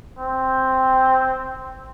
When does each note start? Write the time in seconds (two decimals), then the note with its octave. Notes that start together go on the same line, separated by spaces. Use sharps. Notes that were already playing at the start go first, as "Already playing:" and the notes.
0.19 C4